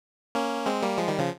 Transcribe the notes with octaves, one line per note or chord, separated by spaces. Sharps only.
A#3 C#4
G#3 C4
G3 A#3
F3 G#3
D#3 G3
C#3 F3